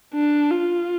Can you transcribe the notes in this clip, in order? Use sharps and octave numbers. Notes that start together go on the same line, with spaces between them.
D4
F4